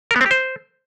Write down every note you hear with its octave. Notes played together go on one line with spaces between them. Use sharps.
A#4
B3
C4
G4
C5